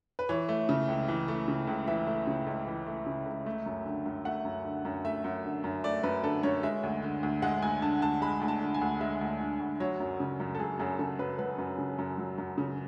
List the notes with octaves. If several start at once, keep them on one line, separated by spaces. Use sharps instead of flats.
B4
E3 C#5
A3
C#3
C#2
E3
A3
C#3
C#2
E3 E5
A3
C#3
C#2
E3
A3
C#3
C#2
A3
F#2
D3
F#2
A3 F#5
F#2
D3
F#2
A3 E5
F#2
D3
F#2
A3 D5
F#2 B4
D3 A4
F#2 C#5
G#3 E5
D2
D3
D2
G#3 F#5
D2 G#5
D3 A5
D2 A5
G#3 B5
D2
A5
D3
G#5
D2
G#3 E5
D2
D3
D2
F#3 C#5
F#2
C#3
F#2
A4
F#3 G#4
F#2 G#4
C#3 A4
F#2 B4
F#3 B4
F#2
C#3
F#2
F#3
F#2
C#3